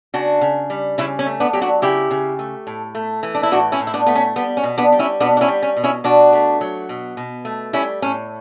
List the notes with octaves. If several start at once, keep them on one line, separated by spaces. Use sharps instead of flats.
C#3 D4 F#4
C#3
G3
C#3 C#4 E4
C#4
A3
B3 D4
F#3 G4
D4 F#4
C#3 E4 G4
C#3
A3
A2
A3
E3
D4
E4
A2 D4 F#4
C#4 E4
A2
E4
B3 D4
A3 B3
C#4
G3 B3
C#4
B2
B3 D4
G3
C#4 E4
B2 B3 D4
D4
C#4 E4
G3
C#4
B2
C#4 E4
B2 D4 F#4
A3
F#3
B2
B2
A3
G3 C#4 E4
A2 C#4